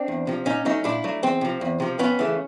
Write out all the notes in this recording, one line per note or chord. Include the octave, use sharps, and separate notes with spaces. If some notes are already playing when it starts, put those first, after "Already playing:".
Already playing: C4 D4
E2
C3 F3
A#2 C#4 D#4
F#3 A3 C#4 D#4
A#2 D4 E4
F#3 A3
E2 C4
C3 F3
E2
C3 F3
F2 B3 C#4
C#3 E3 A3